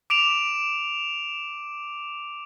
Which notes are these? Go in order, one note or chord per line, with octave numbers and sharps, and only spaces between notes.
D6 D7 E7 F7